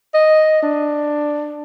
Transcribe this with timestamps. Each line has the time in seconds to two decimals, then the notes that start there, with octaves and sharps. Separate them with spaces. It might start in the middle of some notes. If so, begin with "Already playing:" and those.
0.14 D#5
0.62 D4